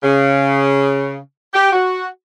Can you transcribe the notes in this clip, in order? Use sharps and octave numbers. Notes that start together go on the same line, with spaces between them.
C#3
G4
F#4